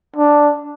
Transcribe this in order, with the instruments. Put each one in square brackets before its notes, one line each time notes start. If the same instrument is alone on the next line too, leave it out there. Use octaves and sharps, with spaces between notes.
[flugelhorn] D4